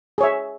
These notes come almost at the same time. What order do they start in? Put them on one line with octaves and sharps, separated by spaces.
G#4 C#5 E5